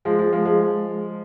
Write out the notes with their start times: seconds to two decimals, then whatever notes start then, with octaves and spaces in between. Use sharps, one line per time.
0.05 F3 G#3
0.18 F3 G#3
0.33 F3 G#3
0.45 F3 G#3